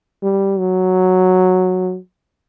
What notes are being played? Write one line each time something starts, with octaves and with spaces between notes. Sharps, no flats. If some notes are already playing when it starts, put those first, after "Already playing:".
G3
F#3